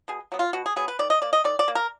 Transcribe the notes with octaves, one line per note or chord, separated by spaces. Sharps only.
B2 G#4
F#3 B3
F4
B2 F#4
G#4
F#3 B3 G#4
B4
D#3 D5
D#5
A#3 D5
D#5
D#3 D5
D5
A#3
A#4